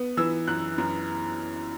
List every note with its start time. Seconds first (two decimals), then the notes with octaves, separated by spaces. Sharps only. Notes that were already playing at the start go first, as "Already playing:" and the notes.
Already playing: B3
0.17 E3 E6
0.47 F#2 F#6
0.78 F#2